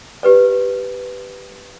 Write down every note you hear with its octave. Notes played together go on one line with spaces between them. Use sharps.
G4 B4 D5